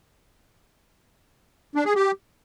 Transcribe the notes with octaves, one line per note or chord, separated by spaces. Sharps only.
D4
G#4
G4